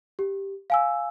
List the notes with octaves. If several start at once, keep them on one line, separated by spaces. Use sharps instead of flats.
G4
F5 G#5 E6